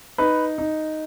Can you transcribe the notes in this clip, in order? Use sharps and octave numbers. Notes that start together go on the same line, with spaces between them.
D#4 B4
D#4